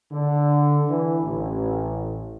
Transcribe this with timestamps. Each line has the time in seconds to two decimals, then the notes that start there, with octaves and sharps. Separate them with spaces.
0.12 D3
0.88 E3
1.24 A1